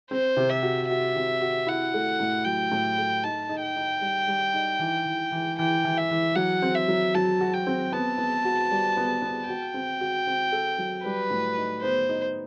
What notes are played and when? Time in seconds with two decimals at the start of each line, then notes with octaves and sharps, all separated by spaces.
0.11 C4 C5
0.37 C3
0.50 E5
0.63 F#4
0.89 F#4 E5
1.16 C3
1.42 F#4
1.67 E4 F#5
1.94 A3
2.20 A2
2.45 F#3 G5
2.72 A2
2.98 A3
3.23 D#4 A5
3.49 D#4
3.62 G5
3.76 D#4
4.01 G3
4.28 G3
4.54 D#4
4.79 E3
5.06 E3
5.32 E3
5.58 E3 G5
5.85 E3
5.98 E5
6.11 E3
6.35 F#3 F#5
6.62 C4
6.75 E5
6.88 F#3
7.14 F#3 A5
7.41 F#4
7.53 G5
7.67 C4
7.92 B3 A5
8.18 B3
8.45 F#4
8.71 G3
8.97 B3
9.22 B3
9.48 F#4 G5
9.74 C4
10.01 F#4
10.27 C4
10.52 A4
10.78 F#3
11.05 G3 B4
11.30 A2
11.57 D#4
11.82 B3 C5
12.09 D#4